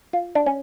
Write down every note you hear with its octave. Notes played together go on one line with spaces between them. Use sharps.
F4
D4
C#4